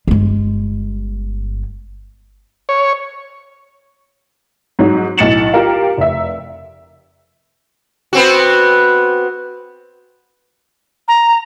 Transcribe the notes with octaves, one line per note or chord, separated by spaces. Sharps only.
G1 G#3
C#5
G#2 F#3
B1 A2 A6 C#7 E7 F#7
F4 G4 A#4 F5
F1 E5
B3 C4 F#4
A#5